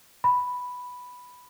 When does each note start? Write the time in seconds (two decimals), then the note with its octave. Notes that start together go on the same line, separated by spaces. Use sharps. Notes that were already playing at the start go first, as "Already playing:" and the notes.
0.24 B5